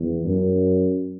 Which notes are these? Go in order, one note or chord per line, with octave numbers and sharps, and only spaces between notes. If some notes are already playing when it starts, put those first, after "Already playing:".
Already playing: E2
F#2